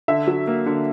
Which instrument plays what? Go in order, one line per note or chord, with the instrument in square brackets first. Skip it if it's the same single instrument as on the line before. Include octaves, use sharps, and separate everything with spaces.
[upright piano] D3 E5
F#3
A#3
D3